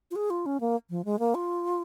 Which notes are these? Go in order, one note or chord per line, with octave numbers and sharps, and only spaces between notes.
F4
G#4
F4
C#4
A#3
F3
G#3
A#3
F4